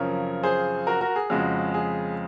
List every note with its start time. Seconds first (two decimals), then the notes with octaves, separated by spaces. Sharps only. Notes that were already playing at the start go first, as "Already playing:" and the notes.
Already playing: F#2 C#3 F3 C4 A#4 C#5
0.43 G#4 C5
0.87 F#4 A#4
1.01 F#4 A#4
1.16 G#4
1.30 F2 C#3 G#3 F#4
1.74 G#4